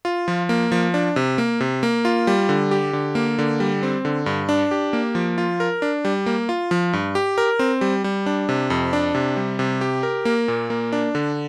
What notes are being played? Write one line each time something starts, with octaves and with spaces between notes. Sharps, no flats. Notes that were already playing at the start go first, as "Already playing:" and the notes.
F4
F3
A#3
F3
D4
C3
A#3
C3
A#3
F4
G3
D3
G4
D3
A#3
D3
G3
C4
D3
G2
D4
G4
A#3
F3
F4
A#4
D4
G3
A#3
F4
F3
G2
G4
A#4
C4
G3
G3
D4
C3
F2
D4
C3
G3
C3
G4
A#4
A#3
A#2
A#3
D4
D3